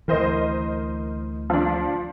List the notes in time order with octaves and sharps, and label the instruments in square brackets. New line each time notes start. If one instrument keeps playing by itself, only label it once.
[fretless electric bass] D2 E3 [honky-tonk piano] A#4 C5 D#5
[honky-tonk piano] F3 D4